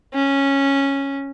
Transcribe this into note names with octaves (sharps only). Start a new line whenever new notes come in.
C#4